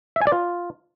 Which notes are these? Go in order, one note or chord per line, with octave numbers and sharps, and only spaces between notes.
E5
G#5
D5
F4